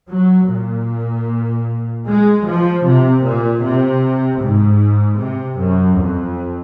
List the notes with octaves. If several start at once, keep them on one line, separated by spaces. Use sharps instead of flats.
F#3
A#2
G#3
F3
C3
A#2
C3
G#2
C3
F#2
F2